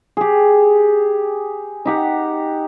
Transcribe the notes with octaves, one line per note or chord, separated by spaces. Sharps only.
G4 G#4
D#4 G4 F#5